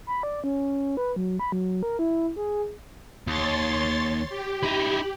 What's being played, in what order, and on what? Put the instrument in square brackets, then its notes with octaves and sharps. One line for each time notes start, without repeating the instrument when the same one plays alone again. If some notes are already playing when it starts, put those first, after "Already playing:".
[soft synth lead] B5
D5
C#4
B4
F#3
B5
F#3
A#4
E4
G#4
[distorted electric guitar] D#2 [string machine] C#5 C6 A6
[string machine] G4
[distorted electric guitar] D#4 E4